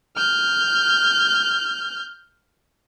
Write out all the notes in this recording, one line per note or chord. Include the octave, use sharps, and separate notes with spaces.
F6 G6